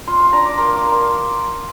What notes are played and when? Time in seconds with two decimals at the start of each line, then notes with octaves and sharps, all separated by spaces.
0.07 F4 C6
0.20 C6
0.33 D4 A#5
0.45 D6
0.58 A#3 C6
0.75 D6
0.84 A#3
0.92 C6